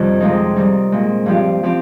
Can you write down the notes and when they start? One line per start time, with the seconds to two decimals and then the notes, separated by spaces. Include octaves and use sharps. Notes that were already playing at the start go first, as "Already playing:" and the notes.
Already playing: F2 C3 D#3 G3 F4
0.20 C3 F3 G#3 C4 D#4
0.56 D#3 G3 C4 D#4
0.92 A#2 G#3 C4
1.26 G2 F3 C4 G4
1.63 F3 C4 G4